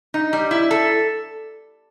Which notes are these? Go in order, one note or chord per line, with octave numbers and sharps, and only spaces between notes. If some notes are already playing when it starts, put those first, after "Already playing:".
D#4
G3
E4
A4